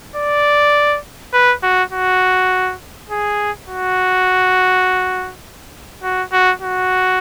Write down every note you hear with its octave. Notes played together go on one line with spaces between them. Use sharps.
D5
B4
F#4
F#4
G#4
F#4
F#4
F#4
F#4